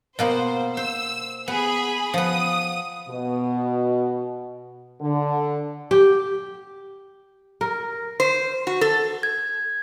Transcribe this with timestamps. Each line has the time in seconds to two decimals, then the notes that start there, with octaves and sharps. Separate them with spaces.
0.19 B2 A#3 B3 C5
0.77 C5 E6
1.48 B3 G#4 B5
2.14 F3 B3 D#6
3.09 B2
5.01 D3
5.91 G4
7.61 A#4
8.20 C5
8.67 F#4
8.81 A4
9.23 G#6